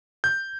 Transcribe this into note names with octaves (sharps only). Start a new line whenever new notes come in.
G6